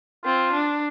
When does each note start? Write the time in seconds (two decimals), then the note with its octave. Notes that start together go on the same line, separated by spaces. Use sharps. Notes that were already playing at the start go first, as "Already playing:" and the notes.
0.25 C4 F4
0.53 D4